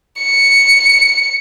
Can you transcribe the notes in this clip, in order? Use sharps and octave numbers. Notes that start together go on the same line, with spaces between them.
C#7